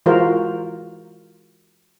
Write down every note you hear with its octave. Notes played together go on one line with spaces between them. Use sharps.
E3 G#3 F4 F#4 A#4 C5